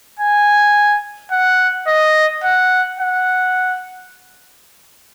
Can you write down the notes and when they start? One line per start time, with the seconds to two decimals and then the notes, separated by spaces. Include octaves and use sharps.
0.19 G#5
1.32 F#5
1.87 D#5
2.44 F#5
2.99 F#5